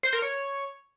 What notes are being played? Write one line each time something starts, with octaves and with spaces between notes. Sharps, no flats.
C5
A#4
C#5